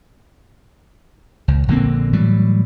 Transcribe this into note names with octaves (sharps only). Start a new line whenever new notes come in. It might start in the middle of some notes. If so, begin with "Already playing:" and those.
C#2
A#1 D3 A#3 C4
A2 E3 F#3 G3